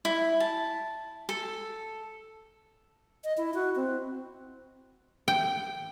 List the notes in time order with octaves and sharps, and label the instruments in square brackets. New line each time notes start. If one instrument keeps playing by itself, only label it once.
[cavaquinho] E4
A5
A4
[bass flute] D#5
E4
F#4
C4
[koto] G5